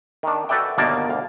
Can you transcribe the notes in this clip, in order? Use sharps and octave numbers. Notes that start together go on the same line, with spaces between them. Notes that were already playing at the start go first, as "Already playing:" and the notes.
D#3 D4
F#4 A4 B4 D5 E5 G5
G1 B2 D#3 A#3 D5 A5
D2 F5